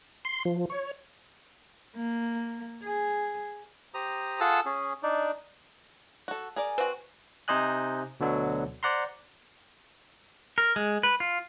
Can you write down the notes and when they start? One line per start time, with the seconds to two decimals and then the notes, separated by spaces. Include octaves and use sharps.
0.25 C6
0.45 F3
0.70 C#5
1.95 A#3
2.84 G#4
3.94 G4 C5 A#5 D#6
4.40 F4 G#4 A4 F#5 A5 E6
4.65 C#4 G#4
5.03 D4 D#4 D5
6.28 F#4 A4
6.56 G#4 A#4 D5 G#5
6.78 C4 F#4 B4
7.48 C3 D#4 C5 D#5 G#5 F#6
8.20 D2 B2 D3 F#3
8.83 C5 D5 F#5 A#5 C6
10.58 A#4
10.76 G#3
11.03 B4
11.20 F4